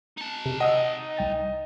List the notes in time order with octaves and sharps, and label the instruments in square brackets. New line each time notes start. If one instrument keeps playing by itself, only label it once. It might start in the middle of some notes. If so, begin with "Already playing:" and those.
[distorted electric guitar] D#4 A5
[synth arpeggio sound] C3
[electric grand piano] D#5 [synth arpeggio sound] F#5 D#6 E6
[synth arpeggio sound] C2 G5 A6